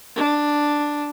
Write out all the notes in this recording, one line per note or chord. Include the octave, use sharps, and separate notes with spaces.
D4